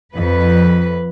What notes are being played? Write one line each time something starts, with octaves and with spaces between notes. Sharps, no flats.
F2 B4